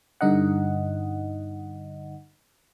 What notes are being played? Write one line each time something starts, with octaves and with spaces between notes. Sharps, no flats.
G2 D3 D#4 D#5 F#5